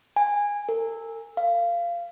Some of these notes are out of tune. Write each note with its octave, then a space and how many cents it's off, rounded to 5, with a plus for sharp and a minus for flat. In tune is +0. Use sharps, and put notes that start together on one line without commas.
G#5 -15
A#4 -45
F5 -15